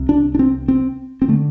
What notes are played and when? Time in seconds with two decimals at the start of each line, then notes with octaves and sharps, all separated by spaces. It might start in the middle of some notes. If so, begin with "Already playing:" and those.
Already playing: C2 C3
0.09 D4
0.35 D4
0.39 C4
0.68 C4
1.22 C4
1.28 D3 A3